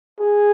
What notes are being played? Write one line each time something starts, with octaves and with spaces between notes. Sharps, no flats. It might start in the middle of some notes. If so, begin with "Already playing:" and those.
G#4